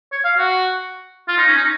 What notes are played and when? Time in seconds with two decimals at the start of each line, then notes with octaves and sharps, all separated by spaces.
0.12 C#5
0.25 F5
0.37 F#4
1.28 F4
1.38 D#4
1.47 C#4
1.57 D#4